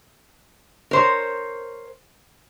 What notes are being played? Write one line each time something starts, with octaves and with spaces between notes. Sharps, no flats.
A#4 C5 C#5